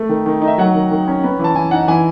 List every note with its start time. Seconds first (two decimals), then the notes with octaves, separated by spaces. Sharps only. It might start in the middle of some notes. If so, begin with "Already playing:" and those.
Already playing: A3
0.09 D#3
0.26 D#3
0.42 D#4
0.47 E5
0.58 F#3 F#5
0.75 D#3
0.91 D#3
1.08 C#4
1.24 B3
1.39 E3
1.44 A5
1.55 E3 G#5
1.71 D#4 F#5
1.88 E3 G#5